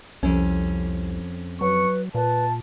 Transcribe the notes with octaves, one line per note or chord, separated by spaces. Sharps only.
C2 F2 C#4
F#3 B4 C#6
A#2 B4 A5